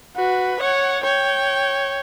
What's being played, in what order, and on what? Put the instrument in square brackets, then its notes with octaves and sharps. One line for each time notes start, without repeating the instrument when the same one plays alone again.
[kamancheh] F#4 [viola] B4
[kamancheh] C#5 [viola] F#5
[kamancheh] C#5 [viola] G5